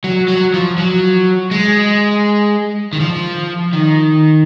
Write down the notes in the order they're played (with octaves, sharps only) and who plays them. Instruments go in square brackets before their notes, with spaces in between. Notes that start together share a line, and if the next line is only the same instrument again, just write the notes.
[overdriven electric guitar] F#3
F#3
F3
F#3
G#3
D#3
F3
D#3